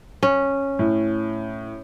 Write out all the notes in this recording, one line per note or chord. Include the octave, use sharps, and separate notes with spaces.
C#4
A2